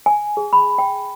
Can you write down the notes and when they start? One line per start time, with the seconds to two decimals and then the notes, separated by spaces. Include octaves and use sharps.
0.06 G#5
0.37 G#4
0.53 B5
0.78 G5